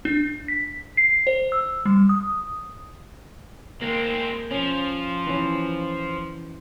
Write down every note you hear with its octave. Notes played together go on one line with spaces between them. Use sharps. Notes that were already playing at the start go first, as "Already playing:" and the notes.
D4
B6
C7
C5
E6
G3
D#6
G#3 A#3 C4
F3 C#4
E3 C#4